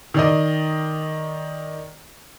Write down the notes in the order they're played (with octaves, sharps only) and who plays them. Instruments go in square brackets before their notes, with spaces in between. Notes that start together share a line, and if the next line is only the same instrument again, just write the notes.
[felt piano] D#3 D5 D#5